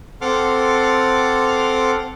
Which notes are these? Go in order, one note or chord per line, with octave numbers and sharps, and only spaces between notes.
C4 A4 F#5 C6 D6 F6